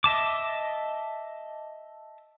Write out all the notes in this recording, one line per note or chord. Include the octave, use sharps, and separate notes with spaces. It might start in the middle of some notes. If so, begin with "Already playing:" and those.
D#5 E5 A5 D6